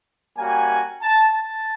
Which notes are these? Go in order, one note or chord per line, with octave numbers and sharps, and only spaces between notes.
G3 A#3 C#4 F#4 G#5
A5
A5